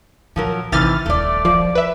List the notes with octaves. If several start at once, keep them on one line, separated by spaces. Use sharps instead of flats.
A#2 F3 F#3 A#4
A1 C3 E3 D#4 F6 A6
D#1 A#1 A3 D5
F3 D5
B4 E5